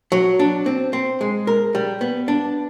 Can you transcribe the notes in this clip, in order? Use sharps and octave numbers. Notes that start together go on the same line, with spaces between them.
F#3
D4
C4
C4
G#3
A#4
G3
B3
D4